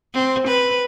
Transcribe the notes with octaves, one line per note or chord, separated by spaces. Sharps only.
C4
B4